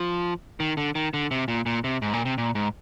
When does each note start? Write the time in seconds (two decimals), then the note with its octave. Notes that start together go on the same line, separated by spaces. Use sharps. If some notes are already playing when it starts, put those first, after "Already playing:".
Already playing: F3
0.60 D#3
0.77 D3
0.95 D#3
1.14 D3
1.31 C3
1.48 A#2
1.66 A#2
1.84 C3
2.02 G#2
2.13 A#2
2.25 C3
2.38 A#2
2.55 G#2